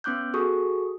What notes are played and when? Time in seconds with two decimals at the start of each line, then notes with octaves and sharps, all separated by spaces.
0.04 B3 C#4 D6 F#6 G6
0.34 F#4 G#4 A4 C#6 D#6